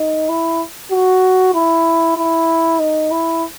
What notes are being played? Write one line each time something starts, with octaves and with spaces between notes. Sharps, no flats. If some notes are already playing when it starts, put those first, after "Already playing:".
Already playing: D#4
E4
F#4
E4
E4
D#4
E4